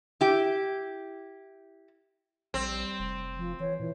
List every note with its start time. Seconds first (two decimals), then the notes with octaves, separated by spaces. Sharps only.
0.21 E4 G4
2.54 A#1 G3 C4
2.99 F1
3.37 F3
3.60 E3 C#5
3.80 A#2 E3